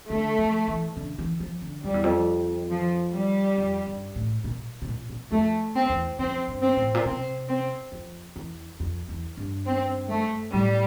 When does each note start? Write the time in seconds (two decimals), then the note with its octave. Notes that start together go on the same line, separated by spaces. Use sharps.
0.10 D3 A3
0.38 F3
0.68 E3
0.97 D3
1.18 E3
1.40 F3
1.62 D3
1.84 F2 G3
1.94 E2
2.04 F2
2.71 F3
3.13 G3
3.57 F2
3.86 G2
4.16 A2
4.44 A#2
4.82 C3
4.88 A#2
5.09 A#2
5.31 F2 A3
5.75 C4
5.89 E2
6.18 F2 C4
6.48 G2
6.62 C4
6.76 A2
6.94 A#2
7.05 C3 C4
7.49 C4
7.92 F2
8.36 E2
8.80 F2
9.09 E2
9.37 G2
9.66 C4
10.10 A3
10.53 A2 G3